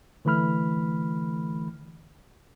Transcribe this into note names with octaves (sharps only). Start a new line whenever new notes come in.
D3 E3 A3 B5 F6